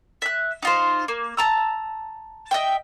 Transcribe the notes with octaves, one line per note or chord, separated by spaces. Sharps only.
E5 F#6
D#4 F4 C5
A#3
A5 A#5 E6
D#5 E5 G5